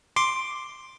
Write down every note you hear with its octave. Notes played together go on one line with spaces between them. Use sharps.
C6 D6